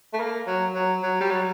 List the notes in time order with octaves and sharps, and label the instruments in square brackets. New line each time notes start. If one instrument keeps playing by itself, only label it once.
[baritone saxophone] A3
A#3
F#3
F#3
F#3
G3
F#3